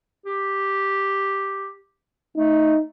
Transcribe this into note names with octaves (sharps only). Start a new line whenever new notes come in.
G4
A3 D#4